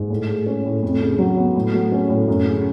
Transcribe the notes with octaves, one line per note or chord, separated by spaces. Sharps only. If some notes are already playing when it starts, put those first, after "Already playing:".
Already playing: G#2
A2
G#3
C#4
A2
F2
C#3
F#3
B3
A2
F#3
C#4
A2
F#2
C#3